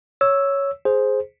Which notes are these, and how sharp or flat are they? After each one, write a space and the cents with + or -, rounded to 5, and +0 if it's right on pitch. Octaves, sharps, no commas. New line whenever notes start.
C#5 +0 E6 +0
G#4 +5 C5 +0